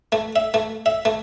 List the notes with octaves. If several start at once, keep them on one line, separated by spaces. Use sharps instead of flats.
A3
E5
A3
E5
A3